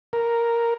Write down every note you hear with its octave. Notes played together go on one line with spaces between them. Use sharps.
A#4